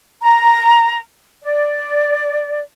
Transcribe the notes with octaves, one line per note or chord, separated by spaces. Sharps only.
A#5
D5